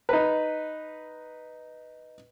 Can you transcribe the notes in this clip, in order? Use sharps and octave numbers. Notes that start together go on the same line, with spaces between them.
D#4 B4